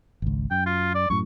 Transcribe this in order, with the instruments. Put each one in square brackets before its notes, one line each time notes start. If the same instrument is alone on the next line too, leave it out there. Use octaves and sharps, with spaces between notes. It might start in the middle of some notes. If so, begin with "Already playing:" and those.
[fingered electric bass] G#1 C#2
[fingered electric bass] F#2 [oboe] G5
[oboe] F4
D5
[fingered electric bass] F#2 A2 [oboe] C#6